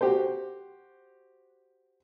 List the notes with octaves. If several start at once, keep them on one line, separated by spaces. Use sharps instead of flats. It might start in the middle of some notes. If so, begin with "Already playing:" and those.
F#4 G4 C5